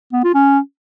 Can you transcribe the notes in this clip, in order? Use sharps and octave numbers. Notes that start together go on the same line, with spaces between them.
B3
F4
C#4